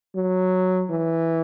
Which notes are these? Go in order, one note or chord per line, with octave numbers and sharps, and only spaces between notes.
F#3
E3